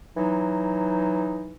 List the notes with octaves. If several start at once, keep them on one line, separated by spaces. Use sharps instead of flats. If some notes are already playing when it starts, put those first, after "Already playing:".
E3 F#3 D#4